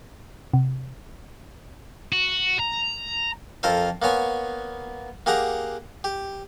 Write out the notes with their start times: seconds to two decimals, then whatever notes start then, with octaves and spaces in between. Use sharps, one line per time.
0.54 C3
2.12 F#4
2.59 A#5
3.63 F2 F4 A4 A#4 C5
4.02 A#3 B3 C#5 G#5
5.26 A#3 G4 G#4 F#5 A#5
6.04 G4